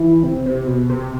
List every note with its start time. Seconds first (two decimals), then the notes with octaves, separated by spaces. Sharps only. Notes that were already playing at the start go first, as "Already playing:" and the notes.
Already playing: E3
0.23 C3
0.46 C3
0.67 B2
0.90 C3